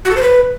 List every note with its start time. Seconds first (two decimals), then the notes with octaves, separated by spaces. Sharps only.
0.05 F#4
0.11 A4
0.16 C5
0.22 B4